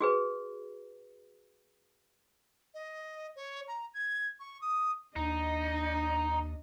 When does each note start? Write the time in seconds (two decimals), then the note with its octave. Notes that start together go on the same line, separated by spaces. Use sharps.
0.01 F#4 G#4 B4
2.74 D#5
3.36 C#5
3.68 A#5
3.94 G#6
4.40 C#6
4.62 D#6
5.16 D#2 D4 D#4 D#5